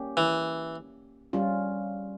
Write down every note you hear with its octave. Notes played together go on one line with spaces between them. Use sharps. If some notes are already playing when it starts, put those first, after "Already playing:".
Already playing: A#3 C#4 G4
E3
G3 C#4 F4